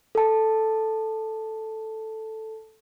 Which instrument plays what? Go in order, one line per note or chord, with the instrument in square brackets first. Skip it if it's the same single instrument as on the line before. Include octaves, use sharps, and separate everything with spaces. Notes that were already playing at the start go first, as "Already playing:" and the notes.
[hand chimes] A4 A5